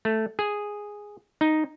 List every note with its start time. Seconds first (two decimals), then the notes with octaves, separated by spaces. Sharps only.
0.05 A3
0.39 G#4
1.41 D#4